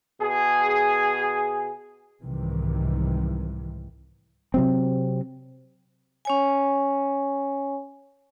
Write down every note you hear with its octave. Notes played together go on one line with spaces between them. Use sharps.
B2 G#4
C2 G#2 C3 D#3 E3
C3 F#3 C4
C#4 C#5 G#5